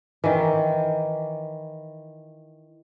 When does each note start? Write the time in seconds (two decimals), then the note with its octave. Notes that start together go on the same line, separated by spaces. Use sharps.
0.24 D#3 E3